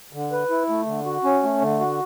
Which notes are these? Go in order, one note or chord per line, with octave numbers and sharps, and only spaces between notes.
D3
B4
E4
A3
D3
F#4
C#4
A3
D3
F#4